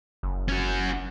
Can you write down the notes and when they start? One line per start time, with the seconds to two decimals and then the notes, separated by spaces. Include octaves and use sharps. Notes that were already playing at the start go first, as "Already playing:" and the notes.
0.23 F#1
0.48 C#4 F#4